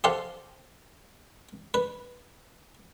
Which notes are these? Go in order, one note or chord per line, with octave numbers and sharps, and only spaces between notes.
G4 A4 C5 F5 F#5
B4